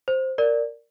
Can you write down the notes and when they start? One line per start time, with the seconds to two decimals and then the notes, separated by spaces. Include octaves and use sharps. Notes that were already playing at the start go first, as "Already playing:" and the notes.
0.08 C5
0.38 A#4 D5